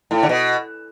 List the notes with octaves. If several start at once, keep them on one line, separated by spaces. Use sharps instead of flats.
A2
D3
B2